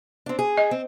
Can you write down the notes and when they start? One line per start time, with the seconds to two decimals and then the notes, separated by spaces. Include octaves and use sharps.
0.26 C4 D4
0.39 G#4
0.57 D#5
0.71 C4